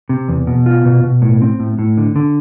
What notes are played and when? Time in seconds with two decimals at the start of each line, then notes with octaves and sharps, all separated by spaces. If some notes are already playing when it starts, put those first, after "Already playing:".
0.09 C3
0.29 E2
0.47 B2
0.66 F4
0.85 B2
1.03 B2
1.22 A2
1.42 C4
1.60 A2
1.79 A2
1.97 D3
2.16 D3